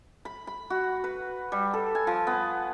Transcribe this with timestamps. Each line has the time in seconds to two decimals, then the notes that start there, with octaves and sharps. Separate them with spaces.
0.25 B5
0.47 B5
0.70 F#4
1.04 B4
1.52 G3
1.74 A4
1.95 G#5
2.07 F3
2.27 B3